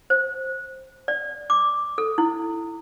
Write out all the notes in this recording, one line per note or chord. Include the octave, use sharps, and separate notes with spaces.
C5
D5
D6
A4
E4